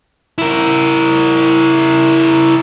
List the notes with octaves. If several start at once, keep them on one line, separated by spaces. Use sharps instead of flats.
E4 A#4